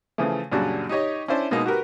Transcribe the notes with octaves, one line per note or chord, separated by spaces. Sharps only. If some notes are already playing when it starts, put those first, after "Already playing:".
C#3 E3 F3 A3
F#2 A#2 C#3 G3 D4 F#4
D#4 G4 C#5 D#5
C#4 D4 E4 C5 D5
B2 G#3 A#3 D#4
F#4 G4 A#4 B4